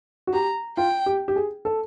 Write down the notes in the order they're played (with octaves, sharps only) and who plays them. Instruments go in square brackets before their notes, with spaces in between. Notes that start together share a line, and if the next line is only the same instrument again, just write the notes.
[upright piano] F#4
[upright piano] G4 [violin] A#5
[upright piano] F4 [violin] G5
[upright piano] G4
G4
G#4
A4